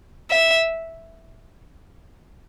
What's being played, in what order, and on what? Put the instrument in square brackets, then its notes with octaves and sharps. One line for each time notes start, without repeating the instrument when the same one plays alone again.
[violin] E5